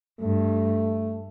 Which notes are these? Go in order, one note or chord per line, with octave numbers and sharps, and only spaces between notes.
G2 A3